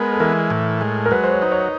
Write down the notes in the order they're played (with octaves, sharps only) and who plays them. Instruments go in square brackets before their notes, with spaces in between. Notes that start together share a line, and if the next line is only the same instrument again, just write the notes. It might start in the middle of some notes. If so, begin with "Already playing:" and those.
Already playing: [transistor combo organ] G#3 B3 [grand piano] A#4
[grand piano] A4
[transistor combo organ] E3 [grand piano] A#4
[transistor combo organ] A2
G#3
[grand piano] A#4
[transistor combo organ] F#3 [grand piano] B4
[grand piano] C5
C#5
[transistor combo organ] D#4 [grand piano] C5
[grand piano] C#5